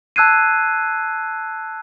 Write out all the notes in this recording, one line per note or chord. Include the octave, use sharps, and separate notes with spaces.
A5 E6 F#6 G#6 C7 D#7